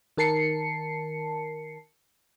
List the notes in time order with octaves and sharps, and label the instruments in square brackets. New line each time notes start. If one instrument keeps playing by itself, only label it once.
[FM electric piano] D#3 A#4 A5 C7 C#7